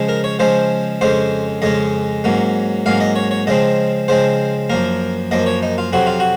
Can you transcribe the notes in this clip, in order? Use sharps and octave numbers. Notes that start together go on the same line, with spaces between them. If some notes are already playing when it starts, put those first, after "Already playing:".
Already playing: C#3 F3 G#3 C#4
A#4
C#5
C#3 F3 G#3 C#4 C5
F2 C#3 G#3 C#4 C5
F2 C#3 G#3 C#4 D#5
G#2 F#3 A#3 C#4
G#2 F#3 A#3 C#4 F5
D#5
C#5
C#5
C#3 F3 G#3 C4 D#5
C#3 F3 G#3 C4 C5
F#2 F3 A#3 A#4
F#2 F3 A#3 D#5
C#5
D#4
F4
F2 C3 F#3 C4 F#4
F4
F#4